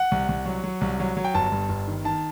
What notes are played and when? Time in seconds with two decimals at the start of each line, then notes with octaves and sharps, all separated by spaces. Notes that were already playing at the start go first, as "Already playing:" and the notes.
Already playing: F#5
0.11 C2
0.29 C2
0.46 F#3
0.64 F#3
0.81 C2
1.00 F#3
1.17 F#3
1.25 G5
1.34 G1 A5
1.52 G2
1.69 G1
1.87 D#3
2.04 D#3 A5